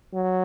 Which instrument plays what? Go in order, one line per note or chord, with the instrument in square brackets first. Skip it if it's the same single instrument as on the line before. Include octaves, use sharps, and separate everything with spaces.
[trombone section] F#3